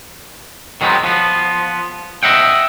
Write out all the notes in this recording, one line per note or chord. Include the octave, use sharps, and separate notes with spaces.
D#3 F#3 G#3 B3 C4
F3 B3
D#5 E5 F#5 G5